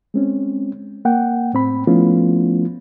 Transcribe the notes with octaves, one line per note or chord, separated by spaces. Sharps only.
G#3 C4 C#4
A#3 F#5 G5
A2 C4 B5
F3 A3 B3 C#4 E4 F4